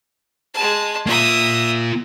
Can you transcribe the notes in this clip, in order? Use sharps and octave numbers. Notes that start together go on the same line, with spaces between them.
G#3 A5
A#3 F4 E5 D#6